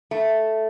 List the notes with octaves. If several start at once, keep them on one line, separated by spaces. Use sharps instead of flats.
A3